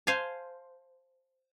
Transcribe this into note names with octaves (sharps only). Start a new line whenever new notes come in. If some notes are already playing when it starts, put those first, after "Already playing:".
C5 F5 G#5 A5